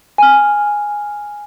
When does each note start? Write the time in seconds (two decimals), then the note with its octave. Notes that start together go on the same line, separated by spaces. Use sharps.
0.18 G#5 F6